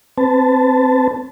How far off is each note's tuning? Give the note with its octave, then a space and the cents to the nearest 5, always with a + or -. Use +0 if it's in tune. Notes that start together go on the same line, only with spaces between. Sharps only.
C4 +0 B4 +35 A5 +0